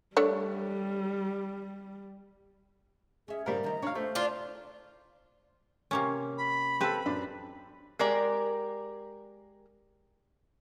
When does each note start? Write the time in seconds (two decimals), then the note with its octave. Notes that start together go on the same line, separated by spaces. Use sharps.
0.17 G3 A3 D4 C#5
3.28 C#4 G#4 E5
3.46 G2 C#3 G3 A#4 C5 F5
3.64 D#3 D#4 A#5
3.82 D4 C#5 F5
3.95 A3 G4 C5
4.15 D4 F4
5.91 C3 A#3 C#4
6.37 B5
6.81 C4 G4 A4 B4
7.06 F#2 D4
7.99 G#3 G4 A#4 D5